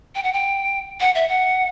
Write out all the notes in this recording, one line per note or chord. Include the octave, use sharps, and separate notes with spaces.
G5
F#5
G5
F#5
E5
F#5